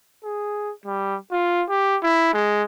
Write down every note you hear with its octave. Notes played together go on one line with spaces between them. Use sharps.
G#4
G3
F4
G4
E4
G#3